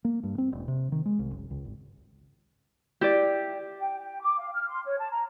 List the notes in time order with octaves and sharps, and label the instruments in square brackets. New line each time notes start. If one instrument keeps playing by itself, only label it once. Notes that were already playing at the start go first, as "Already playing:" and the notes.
[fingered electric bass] A#3
G2
C4
E1
C3
D#3
G#3
C2
F#1
C#2
G#1
[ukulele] E4 D5 [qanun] G4
[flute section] G5
G5
D6
F5
F6
C6
C#5
A5
A#5